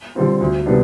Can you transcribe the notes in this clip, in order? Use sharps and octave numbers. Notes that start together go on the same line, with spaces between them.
D3 G3 C4 F4
D2
C3 G3 B3 D4